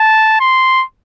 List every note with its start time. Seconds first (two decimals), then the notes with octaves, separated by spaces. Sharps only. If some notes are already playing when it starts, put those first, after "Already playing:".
Already playing: A5
0.40 C6